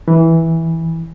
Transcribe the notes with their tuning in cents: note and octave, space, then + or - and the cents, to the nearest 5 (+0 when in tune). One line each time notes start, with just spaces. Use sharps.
E3 -10